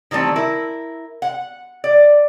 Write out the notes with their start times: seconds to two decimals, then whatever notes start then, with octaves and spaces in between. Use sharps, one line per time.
0.11 D#3 E3 G3 A3 C4
0.36 E4 A#4
1.22 F#5
1.84 D5